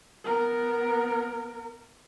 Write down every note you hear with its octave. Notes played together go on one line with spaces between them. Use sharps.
B3 A#4